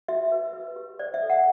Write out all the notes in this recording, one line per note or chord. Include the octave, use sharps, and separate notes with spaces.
F#4 E5
B4
B4
G4
C5 D5
E5
A4
F#5